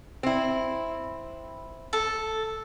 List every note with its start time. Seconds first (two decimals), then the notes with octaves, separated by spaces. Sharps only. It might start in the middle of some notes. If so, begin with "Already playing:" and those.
0.23 C4 E4
1.93 A4